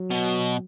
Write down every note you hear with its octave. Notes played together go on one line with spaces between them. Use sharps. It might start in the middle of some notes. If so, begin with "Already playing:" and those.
Already playing: F#3
B2